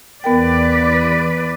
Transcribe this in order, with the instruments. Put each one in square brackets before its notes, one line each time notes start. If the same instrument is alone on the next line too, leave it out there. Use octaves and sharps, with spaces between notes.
[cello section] E2 B4 D5 [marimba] B3 A#4 G5